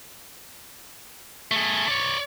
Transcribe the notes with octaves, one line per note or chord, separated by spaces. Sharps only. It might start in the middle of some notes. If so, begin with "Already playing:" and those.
A3 G#4
C#5 D5